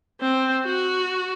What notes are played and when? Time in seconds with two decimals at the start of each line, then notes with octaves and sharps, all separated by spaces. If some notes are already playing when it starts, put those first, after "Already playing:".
0.21 C4
0.65 F#4